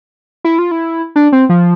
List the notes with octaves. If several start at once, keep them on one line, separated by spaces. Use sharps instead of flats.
E4
F4
E4
D4
C4
F3